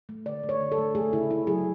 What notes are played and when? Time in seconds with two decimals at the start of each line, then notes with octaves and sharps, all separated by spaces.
0.09 A3
0.26 D3 D5
0.43 A3
0.49 C#5
0.61 D3
0.72 A4
0.78 A3
0.95 A3 G#4
1.13 C#3 E4
1.30 C#3 E4
1.47 F#3 G#4